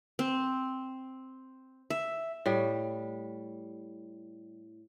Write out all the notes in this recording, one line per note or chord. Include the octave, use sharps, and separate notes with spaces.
C4
E5
A2 G3